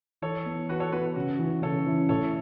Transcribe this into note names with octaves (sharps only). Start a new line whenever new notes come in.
E3 A4 C#5
B3 E4
E3 F#4 B4
A4 C#5
B3 E4 F#4 B4
C#3 F#4
E3 C#4 E4
C#3 A4 C#5
E3 C#4 E4
A2 A4 C#5